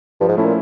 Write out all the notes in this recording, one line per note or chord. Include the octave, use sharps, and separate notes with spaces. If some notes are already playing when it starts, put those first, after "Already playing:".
G2 F3
G#2
A2 A3 C#4 E4
A#2